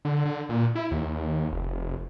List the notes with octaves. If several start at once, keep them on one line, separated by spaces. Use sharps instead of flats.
D3
D3
A#2
E4
D#2
F1